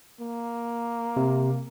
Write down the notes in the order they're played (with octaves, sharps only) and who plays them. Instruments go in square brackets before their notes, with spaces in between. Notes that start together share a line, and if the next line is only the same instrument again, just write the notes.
[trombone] A#3
[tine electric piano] C3